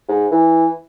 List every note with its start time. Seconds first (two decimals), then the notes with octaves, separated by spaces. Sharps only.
0.09 G#2
0.31 E3